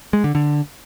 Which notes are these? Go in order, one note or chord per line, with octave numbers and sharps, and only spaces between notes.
G#3
D3
D3